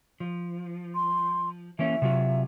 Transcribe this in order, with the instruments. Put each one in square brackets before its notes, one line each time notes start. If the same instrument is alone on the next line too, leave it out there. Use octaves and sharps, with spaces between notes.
[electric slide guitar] F3
[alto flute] C6
[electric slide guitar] E3 A#3 C#4 [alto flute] E5
[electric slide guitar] C3 F#3 F4